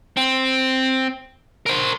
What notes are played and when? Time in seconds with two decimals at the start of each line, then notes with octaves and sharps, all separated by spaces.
0.17 C4
1.66 A#4 C5